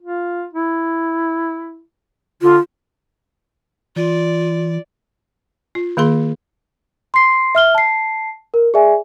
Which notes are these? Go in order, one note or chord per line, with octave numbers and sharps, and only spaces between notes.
F4
E4
D3 F4
E3 F4 D5
F4
D#3 A#3 G#4 C6
C6 C7
E5 F6 G7
A5 C7
A#4
G#4 D5 E5 G#5